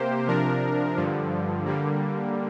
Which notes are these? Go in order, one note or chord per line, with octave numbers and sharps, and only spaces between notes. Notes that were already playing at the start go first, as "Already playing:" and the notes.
Already playing: C3 A#3 G4 C5
C3 F3 D4 A#4
G2 D3 F3
D3 G3 A#3